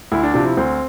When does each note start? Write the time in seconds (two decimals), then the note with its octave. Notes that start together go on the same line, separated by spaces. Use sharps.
0.12 D2 E4
0.23 D4
0.34 C3 F3 D4
0.46 E4
0.57 D2 C4